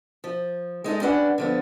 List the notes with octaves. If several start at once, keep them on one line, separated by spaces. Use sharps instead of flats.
F3
G#3 D#4 A4 D#5
G3 C#4 D4 B4 F#5
D3 F3 B3